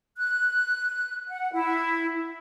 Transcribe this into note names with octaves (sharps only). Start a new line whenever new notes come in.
F#6
F#5
E4